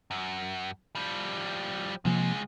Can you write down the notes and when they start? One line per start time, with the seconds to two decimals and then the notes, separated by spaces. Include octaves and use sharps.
0.11 F#2
0.95 F3 G3
2.05 C#2 C3 F3 G#3 A#3